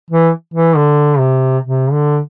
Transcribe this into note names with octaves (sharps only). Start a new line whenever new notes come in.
E3
E3
D3
C3
C3
D3